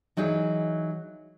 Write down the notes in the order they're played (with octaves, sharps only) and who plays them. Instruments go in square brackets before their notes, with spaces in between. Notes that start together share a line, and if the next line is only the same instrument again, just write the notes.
[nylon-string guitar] E3 F#3 D#4 E4 G#4